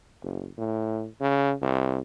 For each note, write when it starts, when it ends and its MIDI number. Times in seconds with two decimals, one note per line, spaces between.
0.23 0.47 30
0.58 1.06 45
1.21 1.53 49
1.62 1.98 36